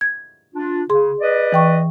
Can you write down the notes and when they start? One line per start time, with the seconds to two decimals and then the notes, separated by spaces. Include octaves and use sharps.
0.01 G#6
0.55 D4 F4
0.90 C#3 G#4 C6
1.20 B4 D5 D#5
1.52 E3 G5 C#6